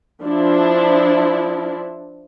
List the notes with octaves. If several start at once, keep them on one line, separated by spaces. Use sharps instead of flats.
F3 D4 E4